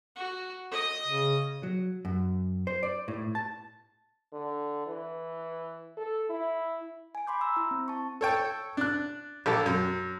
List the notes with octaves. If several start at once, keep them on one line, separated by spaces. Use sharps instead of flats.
F#4
D#5 D#6
C#3
F#3
F#2
C5
D5
A2
A5
D3
E3
A4
E4
G#5 D7
B5 C6 D6 G6
A#5 B5 E6
E4
C4
A5 C#6
A4 C#5 G5 A5
D4 F#6
A#1 G4 A4 A5
F#2